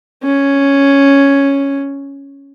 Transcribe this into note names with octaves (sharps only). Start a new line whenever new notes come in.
C#4